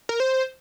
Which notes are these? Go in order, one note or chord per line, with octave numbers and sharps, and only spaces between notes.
A#4
C5